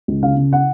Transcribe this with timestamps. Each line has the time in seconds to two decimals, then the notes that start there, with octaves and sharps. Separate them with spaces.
0.08 C#2
0.23 C#3 F5
0.37 C#3
0.53 F#5